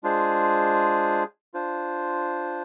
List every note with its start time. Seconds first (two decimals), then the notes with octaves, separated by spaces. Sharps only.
0.03 G#3 D4 F4 G#4 C5
1.54 D4 F4 C5